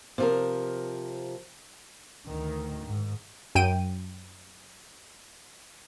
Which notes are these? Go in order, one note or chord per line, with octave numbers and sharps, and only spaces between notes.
C3 F3 A#4
D2 D#3
G#2
F#2 G5 D7 D#7